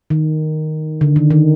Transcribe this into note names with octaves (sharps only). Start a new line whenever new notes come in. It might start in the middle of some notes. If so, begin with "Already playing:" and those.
D#3
D3
D#3
D#3